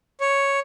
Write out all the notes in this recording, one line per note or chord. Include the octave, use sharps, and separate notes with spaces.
C#5